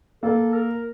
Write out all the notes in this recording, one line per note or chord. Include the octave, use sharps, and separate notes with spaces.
A#3 A4
A#4